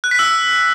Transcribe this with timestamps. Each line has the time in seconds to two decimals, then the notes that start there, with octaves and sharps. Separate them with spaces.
0.04 F#6
0.11 B6
0.19 E6